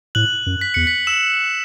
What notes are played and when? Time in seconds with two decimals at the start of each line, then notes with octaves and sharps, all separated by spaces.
0.15 A2 F#6 F#7
0.46 F#2
0.61 B6
0.74 E2 C#7
0.87 B6
1.07 E6 E7